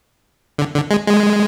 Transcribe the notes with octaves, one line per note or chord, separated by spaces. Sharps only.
D3
D3
G#3
G#3